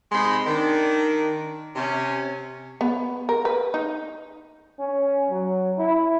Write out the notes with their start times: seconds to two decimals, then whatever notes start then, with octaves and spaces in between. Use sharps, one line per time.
0.12 C3 G#3 D#4 B5 C6
0.47 D#3 D4
1.76 C3 C#4
2.81 B3
3.29 A#4
3.45 B4
3.74 D#4
4.79 C#4
5.31 F#3
5.78 E4